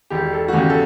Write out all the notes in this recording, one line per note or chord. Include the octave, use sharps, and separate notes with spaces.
E1 G4
A4
F#4
E2 C#3 G4
A4